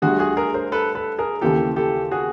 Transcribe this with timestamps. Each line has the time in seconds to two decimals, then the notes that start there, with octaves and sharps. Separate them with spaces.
0.02 D2 D3 G3 F#4 G#4
0.19 F#4 G#4
0.37 G#4 A#4
0.54 A#4 C5
0.72 A4 B4
0.95 A4 B4
1.18 G#4 A#4
1.41 D#2 C#3 E3 G4 A4
1.76 G4 A4
2.11 F#4 G#4